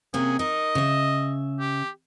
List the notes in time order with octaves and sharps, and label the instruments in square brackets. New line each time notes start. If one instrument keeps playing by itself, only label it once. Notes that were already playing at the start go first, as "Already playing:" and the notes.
[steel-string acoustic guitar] C3 A#3 C#4 [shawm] G#4
[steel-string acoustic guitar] D#4 A#4 [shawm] D#5
[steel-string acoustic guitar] C#3 E5
[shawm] G4